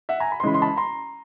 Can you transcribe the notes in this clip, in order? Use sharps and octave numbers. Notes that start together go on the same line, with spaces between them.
E5 F#5
G#5 A#5
B5
C6
C#3 E3 G#3 C#4 B5
C6
A5 B5
A#5 C6